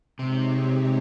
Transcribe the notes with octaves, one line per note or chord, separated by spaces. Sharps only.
C3 G#3 C4 D#4 G4 C#5